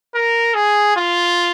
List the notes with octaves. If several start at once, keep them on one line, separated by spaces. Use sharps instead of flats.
A#4
G#4
F4